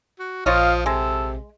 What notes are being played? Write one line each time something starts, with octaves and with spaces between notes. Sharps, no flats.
F#4
A#1 F3 F4 C#5 D#5 F5
C3 G#3 A4